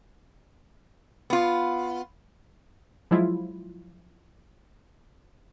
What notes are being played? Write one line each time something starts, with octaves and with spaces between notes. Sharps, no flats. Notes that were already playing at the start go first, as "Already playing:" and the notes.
B3 F4
F3 F#3 G#3 E4 F4